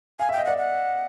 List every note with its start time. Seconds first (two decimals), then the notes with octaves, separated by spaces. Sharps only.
0.19 F5 G#5
0.29 E5 G5
0.38 D#5
0.45 D5 F#5
0.58 F#5